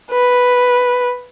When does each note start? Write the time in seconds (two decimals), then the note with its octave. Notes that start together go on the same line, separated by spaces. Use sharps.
0.11 B4